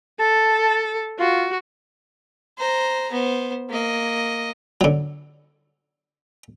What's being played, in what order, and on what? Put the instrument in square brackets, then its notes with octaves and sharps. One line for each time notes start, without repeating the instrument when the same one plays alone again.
[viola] A4 [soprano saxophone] A5
[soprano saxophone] F4 [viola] F#4
[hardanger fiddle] C5 A#5
B3 C5
A#3 D#5
[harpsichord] D3 F#3